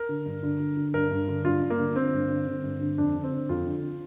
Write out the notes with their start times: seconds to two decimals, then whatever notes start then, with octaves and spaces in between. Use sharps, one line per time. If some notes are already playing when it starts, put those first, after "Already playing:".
Already playing: A#4
0.09 D3
0.26 G2
0.43 D3
0.60 D3
0.77 D3
0.94 G2 A#4
1.11 G2
1.28 D3
1.45 G2 F4
1.62 G2
1.70 A#3
1.79 D3
1.96 D3 C4
2.13 G2
2.30 D3
2.47 D3
2.64 G2
2.81 D3
2.98 F2 D4
3.15 D3
3.24 C4
3.32 D3
3.49 F2 F4
3.66 D3